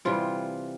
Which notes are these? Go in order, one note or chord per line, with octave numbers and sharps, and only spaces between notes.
C3 E3 G3 F4